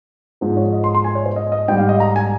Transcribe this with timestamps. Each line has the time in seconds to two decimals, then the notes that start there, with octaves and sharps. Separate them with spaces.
0.41 G#2 F3 G#3
0.57 C#5
0.73 D#5
0.84 C6
0.95 C6
1.04 G#5
1.15 C#5
1.26 C5
1.36 D#5
1.52 D#5
1.68 G#2 G3 G5
1.78 F5
1.89 D#5
2.00 A#5
2.16 G#5